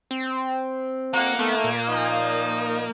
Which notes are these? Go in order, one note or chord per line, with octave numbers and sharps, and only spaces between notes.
C4
F2 A#3 F#5
D#3 A3 B3
A#2
F3 D#4